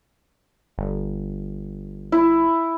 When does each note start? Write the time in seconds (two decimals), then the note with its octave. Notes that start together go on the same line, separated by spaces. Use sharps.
0.78 G1
2.12 E4